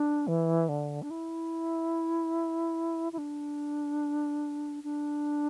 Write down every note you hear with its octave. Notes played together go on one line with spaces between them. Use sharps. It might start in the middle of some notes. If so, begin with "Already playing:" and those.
Already playing: D4
E3
D3
D4
E4
E4
D4
D4